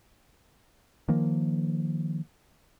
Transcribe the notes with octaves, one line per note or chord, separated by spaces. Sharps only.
D#3 F3 A#3